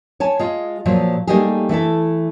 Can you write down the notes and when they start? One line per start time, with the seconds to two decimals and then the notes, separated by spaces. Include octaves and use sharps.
0.20 C#5 G#5 A5
0.39 G#3 F4 G#4
0.85 A#2 F3 F#3
1.27 G3 A3 A#3 D#4 G4 G#4
1.69 E3 A3 E4 A4